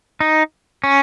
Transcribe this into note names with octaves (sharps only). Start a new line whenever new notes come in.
D#4
C#4